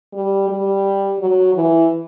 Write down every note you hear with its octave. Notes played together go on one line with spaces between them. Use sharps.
G3
G3
F#3
E3